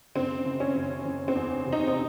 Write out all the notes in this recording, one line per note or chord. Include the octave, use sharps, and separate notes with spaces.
F#1 C4
F#1
C#4
F#1
F#1
C4
E2
C3
D#4
C4